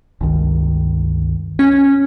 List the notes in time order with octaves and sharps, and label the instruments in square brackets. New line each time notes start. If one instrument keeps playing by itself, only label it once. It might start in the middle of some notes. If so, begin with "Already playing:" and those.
[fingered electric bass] G1 C#2 D#3
[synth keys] C#4